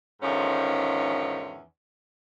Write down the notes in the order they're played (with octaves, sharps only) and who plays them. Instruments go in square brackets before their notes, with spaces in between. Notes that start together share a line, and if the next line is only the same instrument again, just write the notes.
[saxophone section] E2 G#2 D3 D#3 F3 C#4